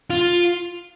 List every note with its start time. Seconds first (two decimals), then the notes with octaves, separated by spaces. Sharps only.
0.10 F4